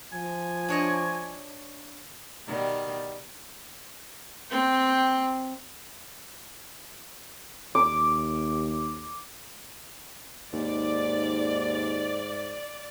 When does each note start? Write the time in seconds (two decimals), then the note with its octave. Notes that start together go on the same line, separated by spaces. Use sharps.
0.13 F3 G#5
0.68 D4 C#5 D#5
2.47 B2 D#3 G3
4.50 C4 G5
7.75 D#2 D6
10.53 D#2 G#2 D5